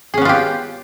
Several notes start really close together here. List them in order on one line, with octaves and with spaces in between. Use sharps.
G#4 C#4 B3 F4 G4